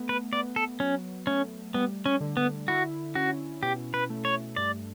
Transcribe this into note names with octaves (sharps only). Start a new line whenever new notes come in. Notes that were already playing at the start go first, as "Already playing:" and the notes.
Already playing: A3 B3
B4
B3 D5
A4
F#3 C#4
A3 C#4
G3 B3
C#4
D3
B3
E4 F#4
C#4 F#4
B2 G4
B4
A3
C#5
G2 D5